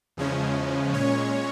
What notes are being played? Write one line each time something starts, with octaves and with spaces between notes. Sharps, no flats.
E2 C#3 F3 G#3 C#4
A#2 G#3 C#4 C#5